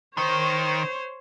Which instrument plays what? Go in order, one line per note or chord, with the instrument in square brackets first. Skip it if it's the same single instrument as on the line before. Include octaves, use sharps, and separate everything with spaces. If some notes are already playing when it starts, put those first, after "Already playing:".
[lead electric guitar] D#3 [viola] C5 C#5